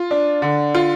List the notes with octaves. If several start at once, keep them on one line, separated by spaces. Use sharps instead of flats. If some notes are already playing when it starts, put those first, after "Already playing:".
Already playing: F4
D4
D3
F4